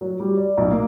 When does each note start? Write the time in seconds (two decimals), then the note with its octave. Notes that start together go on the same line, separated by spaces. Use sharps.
0.01 F#3
0.20 G3
0.37 D5
0.57 B1
0.71 A#3